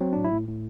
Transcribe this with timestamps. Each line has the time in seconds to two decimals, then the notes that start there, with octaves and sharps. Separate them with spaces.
0.01 F#3 C4
0.13 A2 D4
0.24 E4
0.32 A2
0.48 A2